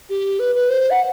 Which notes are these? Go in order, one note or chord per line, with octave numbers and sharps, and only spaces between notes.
G4
B4
B4
C5
F#5